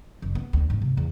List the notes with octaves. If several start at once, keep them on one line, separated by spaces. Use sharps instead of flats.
F#1
B3
D2
G#2
C3
E2